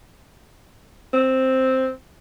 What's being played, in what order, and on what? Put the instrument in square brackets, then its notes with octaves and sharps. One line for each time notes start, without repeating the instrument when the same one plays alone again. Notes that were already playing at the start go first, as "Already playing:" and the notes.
[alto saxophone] C4